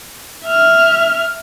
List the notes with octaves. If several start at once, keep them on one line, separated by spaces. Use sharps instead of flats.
E5 F6